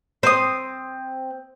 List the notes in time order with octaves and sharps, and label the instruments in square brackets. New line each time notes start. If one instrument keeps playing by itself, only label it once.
[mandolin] C4 D#6 [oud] C5